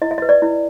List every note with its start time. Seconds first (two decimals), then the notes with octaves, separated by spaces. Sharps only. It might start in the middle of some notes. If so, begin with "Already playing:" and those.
0.02 E4 D#5
0.11 E5
0.18 D#5
0.22 B4
0.29 D5
0.42 E4